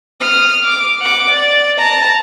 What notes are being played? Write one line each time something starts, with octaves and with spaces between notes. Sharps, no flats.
D#6 F6
D6
F#5 D6
D5
A5 A#5